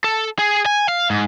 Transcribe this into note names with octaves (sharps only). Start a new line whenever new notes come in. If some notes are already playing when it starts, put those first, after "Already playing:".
A4
G#4
G#5
F5
G#2